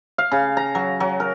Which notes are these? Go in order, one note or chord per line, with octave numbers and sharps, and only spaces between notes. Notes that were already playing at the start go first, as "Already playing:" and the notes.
F5
C#3
A#5
F#3
F#3
A#4